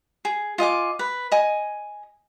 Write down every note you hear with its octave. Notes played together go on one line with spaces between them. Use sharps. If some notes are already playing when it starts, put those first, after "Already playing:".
G#4
F4 D#5 G#5 D6
B4
D#5 G#5